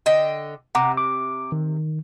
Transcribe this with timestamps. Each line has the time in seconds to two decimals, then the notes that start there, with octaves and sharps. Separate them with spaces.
0.06 D3 D#5 G5
0.75 C3 F#5 A#5 D6
0.97 D6
1.52 D#3